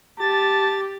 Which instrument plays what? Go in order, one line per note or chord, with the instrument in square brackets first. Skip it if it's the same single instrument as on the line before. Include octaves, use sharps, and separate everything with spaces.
[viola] G4 [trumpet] A5 [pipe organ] A6